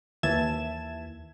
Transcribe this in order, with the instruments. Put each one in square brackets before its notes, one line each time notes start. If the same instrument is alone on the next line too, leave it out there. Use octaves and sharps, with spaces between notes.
[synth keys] D#2 E3 E5 A5 G#6 E7